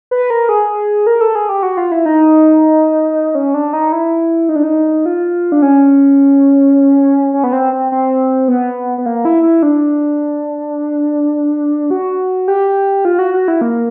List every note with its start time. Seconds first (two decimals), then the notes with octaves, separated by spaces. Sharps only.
0.11 B4
0.30 A#4
0.49 G#4
1.07 A#4
1.21 A4
1.35 G#4
1.49 G4
1.63 F#4
1.77 F4
1.92 E4
2.06 D#4
3.35 C#4
3.54 D4
3.73 D#4
3.92 E4
4.49 D#4
4.56 D4
4.63 D#4
5.06 F4
5.52 D4
5.62 C#4
7.34 C#4
7.44 B3
7.53 C4
7.72 C4
7.92 C4
8.48 B3
8.98 B3
9.06 A#3
9.25 E4
9.43 E4
9.63 D4
11.90 F#4
12.48 G4
13.05 F4
13.19 F#4
13.34 F#4
13.48 E4
13.61 A#3